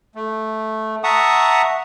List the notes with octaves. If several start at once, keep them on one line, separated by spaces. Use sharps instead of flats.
A3
E5 F#5 A5 A#5 C#6 D#6